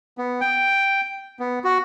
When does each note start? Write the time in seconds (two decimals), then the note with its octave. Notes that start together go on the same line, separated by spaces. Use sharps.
0.18 B3
0.41 G5
1.39 B3
1.64 F#4